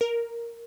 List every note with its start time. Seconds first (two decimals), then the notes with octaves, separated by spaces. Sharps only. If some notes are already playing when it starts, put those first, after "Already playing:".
0.01 A#4